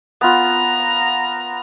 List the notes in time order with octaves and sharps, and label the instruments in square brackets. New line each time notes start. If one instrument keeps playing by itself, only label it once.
[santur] B3 F4 [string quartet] A#5